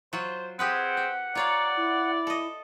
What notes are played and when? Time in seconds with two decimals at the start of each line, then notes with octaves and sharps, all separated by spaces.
0.13 F#3 F4 C5
0.59 C4 G4 G#4 B4 F#5
0.97 G4
1.35 F4 C#5 D5 F5 A#5
1.77 E4
2.27 A4 D#5